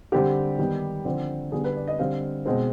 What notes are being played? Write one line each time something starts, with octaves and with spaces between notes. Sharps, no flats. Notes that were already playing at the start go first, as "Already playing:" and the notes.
D3 G3 C4 G4
D#3 G3 B3
D3 F3 C4
D3 G3 B3 G#4
B4
D5
D#5
D3 G3 C4 F5
B2 G#3 C4